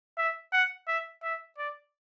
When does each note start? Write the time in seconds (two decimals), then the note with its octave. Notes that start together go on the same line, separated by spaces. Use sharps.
0.18 E5
0.53 F#5
0.88 E5
1.23 E5
1.58 D5